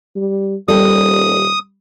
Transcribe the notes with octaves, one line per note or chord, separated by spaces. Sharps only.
G3
D#1 G3 C4 A4 D#6